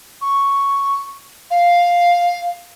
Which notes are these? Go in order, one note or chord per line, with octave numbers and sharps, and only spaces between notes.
C#6
F5